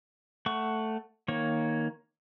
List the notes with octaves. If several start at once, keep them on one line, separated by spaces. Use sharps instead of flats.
A3 F#5 C#6
D#3 A#3 C#5